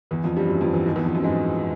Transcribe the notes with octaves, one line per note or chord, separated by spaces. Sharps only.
E2 E3
F2 F3
G2 G3
F#2 F#3
F2 F3
E2 E3
D#2 D#3
E2 E3
F2 F3
F#2 F#3
G#2 G#3